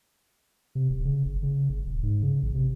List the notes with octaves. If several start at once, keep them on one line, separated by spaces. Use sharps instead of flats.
C3
D#1
C#3
F#1
C#3
G1
D#1
G#2
C#3
A1
C3